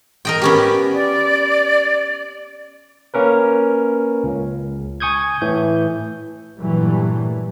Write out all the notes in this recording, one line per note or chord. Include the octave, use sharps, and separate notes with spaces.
A#4 D#5 G5
B3 C#4 G4
D5
A#3 C#4 A#4 B4
C#2
G#5 C#6 D#6 G6 G#6
A2 E3 G6
G2 A#2 E3 F#3 G3 A3